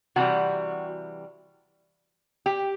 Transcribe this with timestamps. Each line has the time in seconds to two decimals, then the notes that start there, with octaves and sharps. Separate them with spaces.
0.16 C3 E3 G3 F#4
2.46 G4